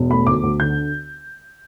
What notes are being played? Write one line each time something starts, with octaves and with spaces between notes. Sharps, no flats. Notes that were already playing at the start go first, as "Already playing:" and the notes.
Already playing: E1
A3 B5
D2 D6
D2
D3 G6